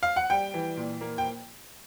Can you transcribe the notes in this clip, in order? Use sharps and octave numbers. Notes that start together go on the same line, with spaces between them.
F5
F#5
G3 G5
E3
A#2
A#3
G5